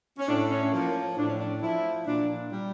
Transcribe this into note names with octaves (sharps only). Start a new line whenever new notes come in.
C#4
A2 D4
C#4
F3 A#3
C#4
A2 D4
C#4
D4
F3 E4
A#2 D4
G3